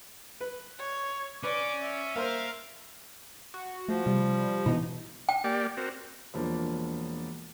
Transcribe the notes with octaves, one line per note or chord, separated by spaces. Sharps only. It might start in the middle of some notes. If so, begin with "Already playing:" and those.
B4
C#5
C#4 B4 D5 D6
E5
A#3 A#4 C5 F5
F#4
F3 A3
C3 G3
B2 E3 B3 D#4 E4
G5
A#3 G4 D5
C4 F#4 A#4
E1 F3 A#3 D4